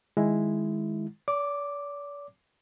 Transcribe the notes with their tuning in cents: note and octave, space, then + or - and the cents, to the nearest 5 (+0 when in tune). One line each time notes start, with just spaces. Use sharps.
D#3 +0 G#3 +0 E4 +0
D5 -40 D6 +0